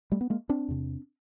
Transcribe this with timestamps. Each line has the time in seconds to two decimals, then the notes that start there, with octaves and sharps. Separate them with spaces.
0.12 G3 A3
0.21 B3
0.30 G#3 A#3
0.49 C4 D4
0.68 E2 C3